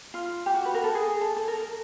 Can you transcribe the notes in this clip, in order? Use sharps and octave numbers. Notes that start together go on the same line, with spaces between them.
F4
G4
F#4
B4
A#4
A4
G#4
A4
A4
A#4